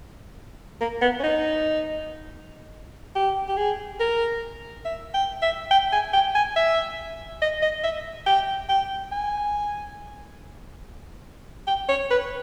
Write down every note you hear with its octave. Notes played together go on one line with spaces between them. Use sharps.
A#3
B3
C#4
D#4
G4
G4
G#4
A#4
E5
G5
E5
G5
G#5
G5
G#5
E5
D#5
D#5
E5
G5
G5
G#5
G5
C#5
B4